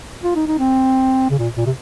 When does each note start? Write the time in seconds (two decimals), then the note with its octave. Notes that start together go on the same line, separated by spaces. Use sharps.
0.23 F4
0.35 D#4
0.47 D#4
0.59 C4
1.30 C#3
1.39 A#2
1.57 A#2
1.66 C3